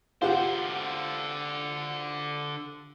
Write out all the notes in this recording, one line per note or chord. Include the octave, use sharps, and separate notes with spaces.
D3 F4 G4 C5 F#5